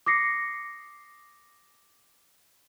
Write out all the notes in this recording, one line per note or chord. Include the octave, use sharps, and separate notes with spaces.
D6 D#6 A#6 C7 C#7